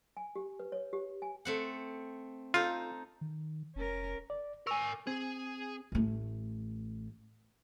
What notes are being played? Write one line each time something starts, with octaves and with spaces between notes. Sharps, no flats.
G#5
G4
B4
C#5
G4
G#5
A3 C4 F#5
D#4 F4 A4 C5
D#3
F1 C#4 A#4
D5
A#4 G#5 C#6 E6
C4 G#4
A1 A3